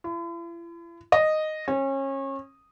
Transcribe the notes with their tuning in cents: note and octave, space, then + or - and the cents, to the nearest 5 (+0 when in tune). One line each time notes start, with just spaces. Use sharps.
E4 +45
D#5 -5
C#4 -30